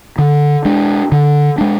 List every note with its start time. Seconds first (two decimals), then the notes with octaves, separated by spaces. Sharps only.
0.18 D3
0.65 G#3 D4
1.12 D3
1.58 G#3 D4